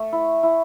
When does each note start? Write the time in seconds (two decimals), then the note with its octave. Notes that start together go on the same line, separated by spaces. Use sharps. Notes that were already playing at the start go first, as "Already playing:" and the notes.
Already playing: A3
0.13 E4
0.43 E4